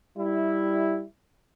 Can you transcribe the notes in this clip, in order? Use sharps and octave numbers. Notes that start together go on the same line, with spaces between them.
G3 E4